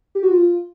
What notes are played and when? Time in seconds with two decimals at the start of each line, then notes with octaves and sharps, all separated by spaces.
0.15 G4
0.23 F#4
0.31 F4